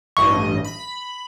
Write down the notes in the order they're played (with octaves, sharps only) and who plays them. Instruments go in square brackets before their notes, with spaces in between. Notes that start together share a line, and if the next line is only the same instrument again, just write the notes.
[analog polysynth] A1 G2 D#5 [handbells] C#6
[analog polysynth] B5